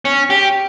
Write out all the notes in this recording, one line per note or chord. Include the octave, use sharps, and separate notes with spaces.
C#4
G4